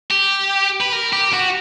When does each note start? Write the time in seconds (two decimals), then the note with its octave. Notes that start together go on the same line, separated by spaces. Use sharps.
0.11 G4
0.81 B4
0.93 A#4
1.13 G4
1.33 F#4